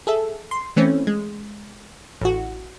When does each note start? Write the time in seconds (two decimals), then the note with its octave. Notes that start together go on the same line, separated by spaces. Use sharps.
0.07 G#4 A4 E5
0.51 C6
0.76 E3 A3 C4 C#4
1.07 G#3
2.21 A1 F#4